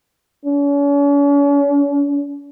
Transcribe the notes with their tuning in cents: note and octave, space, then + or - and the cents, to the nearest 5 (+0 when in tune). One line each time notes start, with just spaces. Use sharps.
C#4 +45